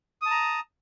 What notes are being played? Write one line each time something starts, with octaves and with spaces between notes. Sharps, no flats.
A5 A#5 D#6